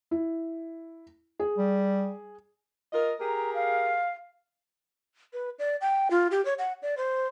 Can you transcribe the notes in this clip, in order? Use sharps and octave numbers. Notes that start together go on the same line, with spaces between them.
E4
G#4
G3
F4 A#4 D#5
G4 G#4 A#4 A#5
F5
B4
D5
G5
F4
G4
C#5
F#5
D5
C5